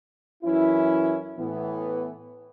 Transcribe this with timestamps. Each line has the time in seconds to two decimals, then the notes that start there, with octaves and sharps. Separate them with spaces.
0.44 F#2 E3 C#4 E4
1.37 A2 E3 B3